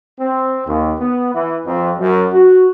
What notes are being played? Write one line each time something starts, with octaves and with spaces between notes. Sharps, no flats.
C4
D#2
B3
E3
F2
F#2
F#4